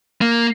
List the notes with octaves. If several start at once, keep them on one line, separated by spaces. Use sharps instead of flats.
A#3